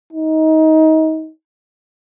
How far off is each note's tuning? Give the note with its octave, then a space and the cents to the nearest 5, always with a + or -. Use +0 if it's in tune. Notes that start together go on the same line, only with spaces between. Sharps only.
D#4 +25